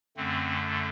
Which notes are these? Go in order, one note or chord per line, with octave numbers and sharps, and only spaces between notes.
F#2 D3 A3 C4